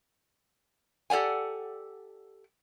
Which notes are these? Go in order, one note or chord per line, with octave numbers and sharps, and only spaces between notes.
G4 A4 D5 F#5 G#5